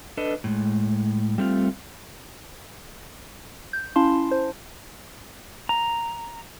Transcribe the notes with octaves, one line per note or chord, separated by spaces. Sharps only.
D4 A4 B4 D#5
A2 G#3
G3 A3 C4 F4
G6
C#4 E4 F5 A5 C6
C5
A#5